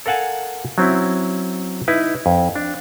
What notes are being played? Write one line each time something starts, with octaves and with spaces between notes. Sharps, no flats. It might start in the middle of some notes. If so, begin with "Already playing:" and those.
A4 A#4 F5 F#5 G#5 A5
F#3 C4 C#4 E4
D#4 E4 B4
F2
D4